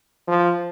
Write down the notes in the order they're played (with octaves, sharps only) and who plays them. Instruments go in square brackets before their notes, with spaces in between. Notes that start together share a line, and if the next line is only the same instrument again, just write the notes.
[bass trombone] F3